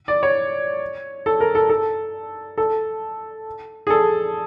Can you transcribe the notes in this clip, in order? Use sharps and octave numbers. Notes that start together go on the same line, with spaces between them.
D5
C#5
A4
A#4
A4
A4
A4
G#4
A4